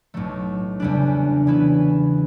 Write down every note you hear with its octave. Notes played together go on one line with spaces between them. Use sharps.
B1 A2 F#3 A3
E2 C#3 G3 D4
C#3 E3 B3 E4 B4